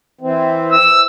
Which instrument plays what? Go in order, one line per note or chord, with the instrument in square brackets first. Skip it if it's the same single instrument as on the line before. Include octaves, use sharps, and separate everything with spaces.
[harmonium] E3 C4
[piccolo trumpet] E6